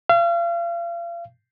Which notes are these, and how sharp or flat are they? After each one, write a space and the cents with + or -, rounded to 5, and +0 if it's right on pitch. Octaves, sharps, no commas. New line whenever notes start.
F5 -35